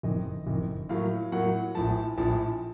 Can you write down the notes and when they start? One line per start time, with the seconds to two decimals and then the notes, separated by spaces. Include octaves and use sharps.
0.03 F#1 F2 D#3 D#5
0.47 F#1 F2 D#3
0.89 A2 F#3 A#3 F5
1.32 A2 F#3 A#3 F#5
1.75 A#1 A2 F3 A5
2.18 A#1 A2 F3 A5